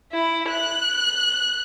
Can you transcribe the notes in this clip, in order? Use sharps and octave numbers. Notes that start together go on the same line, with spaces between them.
E4
F#6